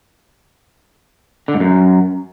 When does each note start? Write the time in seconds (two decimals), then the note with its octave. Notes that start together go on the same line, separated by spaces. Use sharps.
1.48 D3
1.54 G#2
1.60 F#2